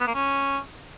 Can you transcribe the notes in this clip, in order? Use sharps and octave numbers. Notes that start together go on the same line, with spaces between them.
B3
A#3
C#4